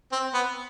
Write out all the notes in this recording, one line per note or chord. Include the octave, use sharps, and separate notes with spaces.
C4
B3